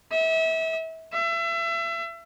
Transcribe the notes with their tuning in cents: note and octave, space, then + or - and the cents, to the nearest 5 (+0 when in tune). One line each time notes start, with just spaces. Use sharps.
E5 -30
E5 +30